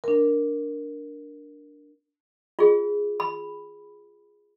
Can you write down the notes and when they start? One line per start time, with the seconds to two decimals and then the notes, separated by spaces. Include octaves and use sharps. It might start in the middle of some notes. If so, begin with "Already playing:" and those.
0.04 D4 A#4
2.59 F4 G#4
3.20 B5